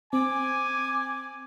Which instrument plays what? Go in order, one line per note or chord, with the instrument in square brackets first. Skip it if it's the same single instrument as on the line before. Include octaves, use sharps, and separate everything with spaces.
[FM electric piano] C4 [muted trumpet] G#5 [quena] D6